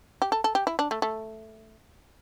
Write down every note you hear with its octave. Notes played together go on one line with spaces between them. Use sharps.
G4
A4
A4
G4
E4
D4
A3
A3